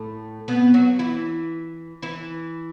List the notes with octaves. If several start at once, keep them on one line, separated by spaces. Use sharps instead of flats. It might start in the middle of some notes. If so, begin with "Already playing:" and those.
Already playing: A2 A3
B2 B3
F#3 F#4
E3 E4
E3 E4